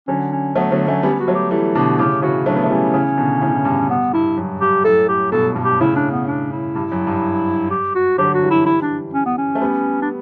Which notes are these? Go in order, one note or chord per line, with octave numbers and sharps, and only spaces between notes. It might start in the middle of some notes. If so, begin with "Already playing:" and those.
D3 F#3 C#4
C#4
F#3 A3 B3
D3 F#3 B3
F#3 A3 C#4
G3 B3 C#4
F#4
F#3 A3
G4
E3 G3 A4
B2 D3 G4
A2 C#3 G4
C#3 E3 F#4
F#3 A3 D4
B3
A3
E3 G3 C#4
C#3 E3
B2 D3
A2 C#3
A2
G2
G2 B3
G2 E4
F#2
G2 G4
F#2 A2 A4
G4
G2 B2 A4
G2 B2
G4
A2 C#3 E4
D4
B3
D4
E4
G2
F#2
G2
G4
F#4
D3 F#3 G4
F#4
E3 G3
E4
E4
D4
C#4
B3
C#4
A3
G3 B3
D4